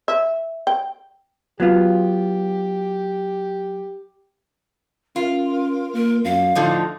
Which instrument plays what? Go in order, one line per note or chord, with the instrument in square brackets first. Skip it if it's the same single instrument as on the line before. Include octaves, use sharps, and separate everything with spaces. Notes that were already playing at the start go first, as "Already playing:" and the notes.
[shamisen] E5
G5
[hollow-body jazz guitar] F#3 B3 F4 [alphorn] G4
[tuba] C#4 [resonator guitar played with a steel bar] F4 [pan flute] A#4
[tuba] A#3 [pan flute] A#4
[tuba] F#2 [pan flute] F5
[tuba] A2 [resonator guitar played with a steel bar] D3 F3 D#4